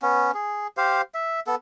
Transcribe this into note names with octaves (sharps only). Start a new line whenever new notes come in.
B3 C#4
G#4
G4 C5 F5
E5
B3 A4